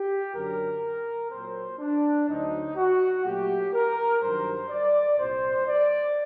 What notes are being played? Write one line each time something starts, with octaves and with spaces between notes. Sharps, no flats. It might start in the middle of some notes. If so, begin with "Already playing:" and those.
Already playing: G4
F#2 D3 F#3 A#4
A#2 F#3 C4 C5
D4
D2 D3 F#3 C4 D#4
F#4
A#2 F#3 A3 G4
A#4
G2 D#3 F#3 C5
D5
C2 A#2 G3 C5
D5